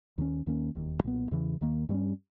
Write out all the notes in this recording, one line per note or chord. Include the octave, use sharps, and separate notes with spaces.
D#2 D#3 A#3 C#4
D#2 D#3 A#3 C#4
E1 D#2 D#3
B1 A#2 G3 B3
E2 C#3 E3
D#2 D#3 A#3
G2 G3 A#3
C#4